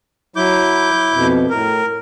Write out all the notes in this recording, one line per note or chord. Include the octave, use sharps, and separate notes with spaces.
F#3 E4 D6 G6
F2 B2
A2 A#4